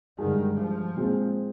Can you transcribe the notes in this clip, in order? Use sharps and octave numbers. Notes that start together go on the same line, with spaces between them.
G2 D3 D#3 G#3
F3
A#2 G#3 C4 F4